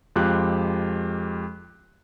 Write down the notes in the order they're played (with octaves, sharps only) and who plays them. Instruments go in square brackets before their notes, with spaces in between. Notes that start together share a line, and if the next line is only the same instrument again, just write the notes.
[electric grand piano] F2 G#3 F4 G4 F#6